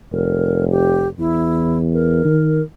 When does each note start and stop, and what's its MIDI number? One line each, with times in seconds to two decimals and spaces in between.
0.12 1.13 29
0.12 0.65 70
0.71 1.08 67
1.19 2.22 40
1.19 1.78 64
1.94 2.62 70
2.25 2.61 51